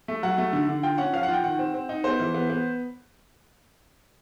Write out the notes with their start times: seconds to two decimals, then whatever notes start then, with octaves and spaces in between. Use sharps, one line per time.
0.08 A3
0.23 F#3 F#5
0.38 A3
0.53 D3
0.69 D3
0.83 F4 G5
0.98 C#4 F#5
1.13 F3 F5
1.23 F#5
1.28 F4
1.33 G5
1.44 D#3 F#5
1.59 C4
1.74 C4
1.89 D#4
2.04 B3 C5
2.20 E3
2.34 B3
2.50 B3